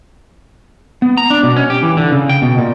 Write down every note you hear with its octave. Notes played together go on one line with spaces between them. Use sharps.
B3
A#5
D4
B2
C#4
G4
E3
D3
C#3
G5
B2
A#2